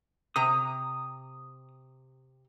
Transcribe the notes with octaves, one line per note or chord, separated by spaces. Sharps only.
C3 A#5 D#6